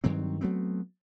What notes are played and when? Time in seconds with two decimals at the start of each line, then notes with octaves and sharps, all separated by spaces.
0.04 G2 D#3 F#3 C4
0.41 F#3 A3 B3 C4